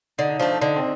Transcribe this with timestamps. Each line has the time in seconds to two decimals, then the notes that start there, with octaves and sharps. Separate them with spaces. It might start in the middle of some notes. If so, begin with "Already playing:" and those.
0.18 D3 D#4
0.29 D#4
0.40 F3 A3 D4
0.61 D3 D#4
0.76 C4